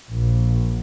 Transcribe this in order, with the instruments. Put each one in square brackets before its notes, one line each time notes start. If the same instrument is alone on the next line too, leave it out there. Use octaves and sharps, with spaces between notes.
[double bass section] A#1